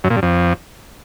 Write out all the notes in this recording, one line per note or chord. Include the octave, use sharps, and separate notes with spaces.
F#2
A#2
G2
F2